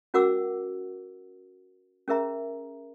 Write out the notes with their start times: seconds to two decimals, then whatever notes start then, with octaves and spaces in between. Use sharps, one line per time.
0.14 C#4 F#4 A#4 F#5 D6 E6
2.08 C#4 G#4 A#4 E5 A#5